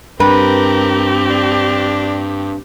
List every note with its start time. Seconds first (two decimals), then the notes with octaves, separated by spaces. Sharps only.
0.20 G2 C4 G4 A#4 B4
1.30 D4